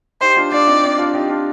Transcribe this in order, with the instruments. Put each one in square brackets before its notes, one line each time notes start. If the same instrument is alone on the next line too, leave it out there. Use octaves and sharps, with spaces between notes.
[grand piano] D#4 G4 [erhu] C5
[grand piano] D4 F4
[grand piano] D4 F4 [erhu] D5
[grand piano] C4 D#4
C4 D#4
D4 F4
D#4 G4
D4 F4